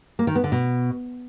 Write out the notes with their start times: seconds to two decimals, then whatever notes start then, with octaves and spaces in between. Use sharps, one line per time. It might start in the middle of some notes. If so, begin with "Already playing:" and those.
0.19 A#3
0.27 D#3
0.35 B3
0.44 D3
0.52 B2